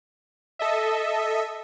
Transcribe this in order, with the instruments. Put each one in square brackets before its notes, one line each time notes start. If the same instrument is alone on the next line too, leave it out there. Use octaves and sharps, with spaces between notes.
[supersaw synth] A4 D#5 E5